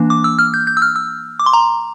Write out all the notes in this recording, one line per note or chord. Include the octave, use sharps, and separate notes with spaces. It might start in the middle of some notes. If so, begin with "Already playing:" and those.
Already playing: E3 A#3 D4
D6
E6
F6
G6
G6
E6
F6
E6
D6
C6
A#5